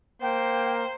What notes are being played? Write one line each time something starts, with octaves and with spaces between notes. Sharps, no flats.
A#3 C5 G5